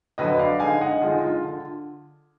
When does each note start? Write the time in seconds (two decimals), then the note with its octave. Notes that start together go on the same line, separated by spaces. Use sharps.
0.18 F2 D3 F#3 B4 D#5
0.39 D5 F5
0.60 D3 G#3 D#4 F5 G#5
0.81 D#5 F#5
1.02 D3 G#3 D#4 F4 G#4
1.24 F4
1.44 D3